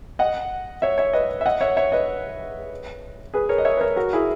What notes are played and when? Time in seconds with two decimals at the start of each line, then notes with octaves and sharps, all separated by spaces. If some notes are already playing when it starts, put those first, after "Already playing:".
0.19 D#5 F#5
0.82 C#5 E5
0.98 C#5 E5
1.13 B4 D#5
1.41 E5
1.46 D#5 F#5
1.61 C#5 E5
1.77 C#5 E5
1.92 B4 D#5
3.34 G#4 B4
3.49 A#4 C#5
3.58 D#5
3.65 C#5 E5
3.77 B4
3.81 A#4 C#5
3.96 F#4 A#4
4.13 E4 G#4